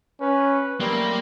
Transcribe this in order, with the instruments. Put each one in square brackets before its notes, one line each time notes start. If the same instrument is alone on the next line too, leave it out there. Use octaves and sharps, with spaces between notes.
[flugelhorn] C#4 [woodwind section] B4
[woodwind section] F#3 A3 C4 [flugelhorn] G3 [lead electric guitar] A#3